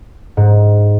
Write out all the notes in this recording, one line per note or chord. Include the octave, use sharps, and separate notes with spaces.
G#2